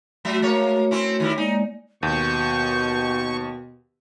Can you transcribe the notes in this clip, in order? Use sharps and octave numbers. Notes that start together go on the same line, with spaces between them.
F#3 A3 F#4 E5
G#3 A#3 C#5
C4 C#4 E4
D#3 G3 E4
G#3 A#3 D#4 D5
D#2 B2 C#6 G6